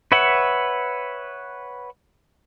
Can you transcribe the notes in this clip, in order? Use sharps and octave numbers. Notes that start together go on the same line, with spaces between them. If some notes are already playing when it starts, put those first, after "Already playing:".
B4 C#5 E5 F#5